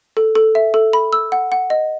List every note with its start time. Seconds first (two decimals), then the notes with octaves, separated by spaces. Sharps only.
0.17 A4
0.35 A4
0.55 E5
0.74 A4
0.93 B5
1.13 E6
1.32 F#5
1.52 F#5
1.70 D#5